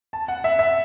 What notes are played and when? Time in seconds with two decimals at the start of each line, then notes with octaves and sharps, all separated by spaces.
0.13 A5
0.28 F#5
0.44 E5
0.59 E5